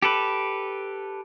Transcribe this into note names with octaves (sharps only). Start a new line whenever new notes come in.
G4 A4 B4